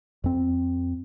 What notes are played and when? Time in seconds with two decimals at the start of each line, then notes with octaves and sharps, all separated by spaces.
0.24 F2 C4